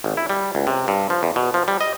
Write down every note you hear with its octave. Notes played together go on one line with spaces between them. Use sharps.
G#1
E4
G3
C#2
C3
G2
F3
E2
B2
F3
G3
D#5